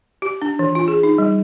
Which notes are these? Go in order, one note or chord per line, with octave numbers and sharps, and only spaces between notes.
G4
D4
E3
F4
G#4
D#4
G3